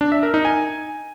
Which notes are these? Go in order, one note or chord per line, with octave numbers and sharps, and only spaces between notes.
D4
E5
A#4
D#4
G#5